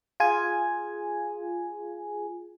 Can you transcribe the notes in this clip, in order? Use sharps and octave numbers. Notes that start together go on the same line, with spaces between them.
F4 G#4 G#5